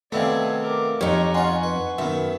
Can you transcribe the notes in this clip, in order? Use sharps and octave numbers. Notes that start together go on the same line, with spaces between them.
C3 D#3 A3 B3 D5 E5 F5 G#5
A#4 D6
F2 D#4 G4 C#5 A#5 C#6
C#4 F4 F#5 G#5 C6 C#6
B4
F#2 D#3 B3 E5